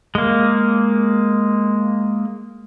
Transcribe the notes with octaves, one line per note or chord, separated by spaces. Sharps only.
G#3 A#3